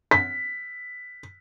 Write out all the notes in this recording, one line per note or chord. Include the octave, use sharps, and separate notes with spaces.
B6